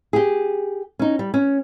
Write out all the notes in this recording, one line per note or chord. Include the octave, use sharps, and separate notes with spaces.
G4 G#4
C#4 D#4
G3
C#4